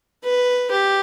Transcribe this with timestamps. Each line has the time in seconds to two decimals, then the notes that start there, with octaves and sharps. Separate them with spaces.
0.24 B4
0.71 G4